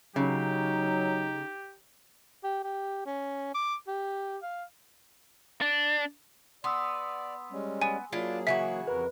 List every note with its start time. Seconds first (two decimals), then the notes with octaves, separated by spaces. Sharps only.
0.16 C#3 F#3 D#4 G4
2.44 G4
2.64 G4
3.06 C#4
3.54 D6
3.87 G4
4.43 F5
5.61 D4
6.64 B3 D5 C6 D#6 E6
7.52 G3 G#3 C#4
7.82 B3 G#5
8.12 F#3 A#3 D4 E4 F4 G#4
8.47 C#3 E3 F#4 E5
8.88 F2 A#4 B4